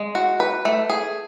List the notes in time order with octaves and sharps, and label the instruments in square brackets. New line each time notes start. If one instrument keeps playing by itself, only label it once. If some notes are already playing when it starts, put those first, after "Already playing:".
Already playing: [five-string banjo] G#3
F#4
B4
A3
G#4